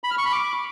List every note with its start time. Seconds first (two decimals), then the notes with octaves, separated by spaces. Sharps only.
0.04 B5
0.11 F6
0.18 C#6
0.25 B5
0.32 D6